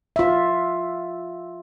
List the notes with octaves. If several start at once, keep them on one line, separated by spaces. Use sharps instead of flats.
F4 E5